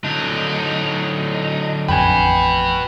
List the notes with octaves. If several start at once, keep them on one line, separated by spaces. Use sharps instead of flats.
D3 F#3 D#4
A1 F2 F#4 B4 G5 G#5